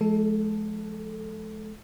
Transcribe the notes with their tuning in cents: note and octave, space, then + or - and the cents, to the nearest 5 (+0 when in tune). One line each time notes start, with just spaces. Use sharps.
F3 +0 G#3 +40 A4 +0